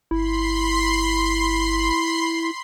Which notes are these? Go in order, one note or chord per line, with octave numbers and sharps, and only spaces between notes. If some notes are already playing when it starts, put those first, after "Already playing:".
G1 E4 B5 C6 C7